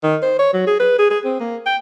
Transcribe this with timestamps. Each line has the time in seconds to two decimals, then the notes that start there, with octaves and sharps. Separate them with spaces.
0.03 D#3
0.22 C5
0.39 C#5
0.53 F#3
0.67 G#4
0.79 B4
0.99 G#4
1.10 G#4
1.24 C4
1.40 A#3
1.66 G5